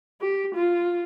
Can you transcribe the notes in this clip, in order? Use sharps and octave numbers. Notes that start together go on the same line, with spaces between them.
G4
F4